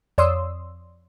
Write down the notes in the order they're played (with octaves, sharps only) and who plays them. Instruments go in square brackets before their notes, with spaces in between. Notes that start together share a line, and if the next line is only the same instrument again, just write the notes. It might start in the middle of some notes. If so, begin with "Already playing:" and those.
[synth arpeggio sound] F2 C#5 D5 C6 D#6 E6